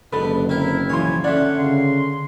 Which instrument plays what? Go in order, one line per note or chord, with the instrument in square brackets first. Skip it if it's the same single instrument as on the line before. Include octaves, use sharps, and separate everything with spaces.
[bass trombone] F#1 [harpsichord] D3 G#3 [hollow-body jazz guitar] G4 A4 B4
[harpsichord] C4 A#4 [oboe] E4
[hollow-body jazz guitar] B1 E3 C6 [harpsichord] F3 C#5 [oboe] G#5
[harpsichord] D3 C#4 [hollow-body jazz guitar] D5 E5 [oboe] F#5
[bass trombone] C#3 [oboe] C6